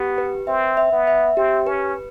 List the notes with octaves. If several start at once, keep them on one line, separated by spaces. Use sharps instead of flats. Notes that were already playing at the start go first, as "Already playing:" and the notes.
Already playing: B3 G4
B4
C4 E5
E5
B3
E5
C4 G4
C#4 B4